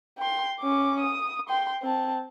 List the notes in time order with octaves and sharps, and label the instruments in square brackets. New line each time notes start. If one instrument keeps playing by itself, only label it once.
[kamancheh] G5 C6
C#4 D6
D#6
G5 C6
C4 A5